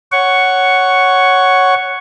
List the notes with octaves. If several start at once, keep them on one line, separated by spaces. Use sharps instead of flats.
C#5 F#5 C#6